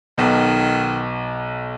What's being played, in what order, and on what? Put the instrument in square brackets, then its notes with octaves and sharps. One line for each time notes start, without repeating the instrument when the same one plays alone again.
[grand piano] B1 B2 [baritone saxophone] D#3